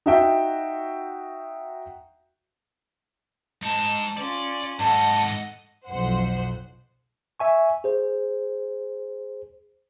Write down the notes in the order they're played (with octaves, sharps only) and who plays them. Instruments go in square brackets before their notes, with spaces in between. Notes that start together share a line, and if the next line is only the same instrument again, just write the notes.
[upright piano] D#4 F#4 E5 G5
[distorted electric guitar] G#2 D#4 [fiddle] A5
[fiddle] C#4 F4 [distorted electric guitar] D5
[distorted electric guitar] G#2 A4 [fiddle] D#5 F#5 [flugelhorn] A5
[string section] B1 F2 C5 F#5
[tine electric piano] E5 G#5 C#6
G#4 C5